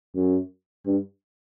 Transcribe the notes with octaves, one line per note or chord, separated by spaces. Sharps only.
F#2
G2